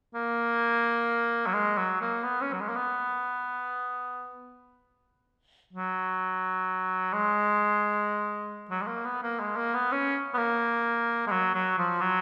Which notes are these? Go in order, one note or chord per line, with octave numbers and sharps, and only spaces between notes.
A#3
F#3
G#3
F#3
A#3
B3
C#4
F#3
G#3
A#3
B3
F#3
G#3
F#3
G#3
A#3
B3
A#3
G#3
A#3
B3
C#4
B3
A#3
G#3
F#3
F#3
F3
F#3